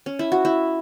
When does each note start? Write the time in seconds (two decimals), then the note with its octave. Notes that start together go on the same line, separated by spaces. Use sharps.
0.06 C#4
0.19 E4
0.32 F#4
0.45 E4